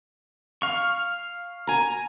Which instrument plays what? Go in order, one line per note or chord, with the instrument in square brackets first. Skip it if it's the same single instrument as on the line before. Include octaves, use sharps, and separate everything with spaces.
[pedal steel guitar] F5 C#6
[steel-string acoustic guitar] G#5 A#5